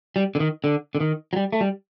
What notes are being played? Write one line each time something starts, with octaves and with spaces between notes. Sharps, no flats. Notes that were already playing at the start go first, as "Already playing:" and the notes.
G3
D3
D#3
D3
D3
D#3
F#3
G3
A3
G3